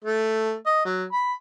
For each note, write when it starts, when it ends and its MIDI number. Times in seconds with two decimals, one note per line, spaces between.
0.04 0.55 57
0.66 0.82 75
0.85 1.04 54
1.12 1.34 83